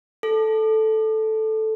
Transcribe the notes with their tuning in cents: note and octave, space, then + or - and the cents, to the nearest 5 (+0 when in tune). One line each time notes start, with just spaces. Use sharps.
A4 -5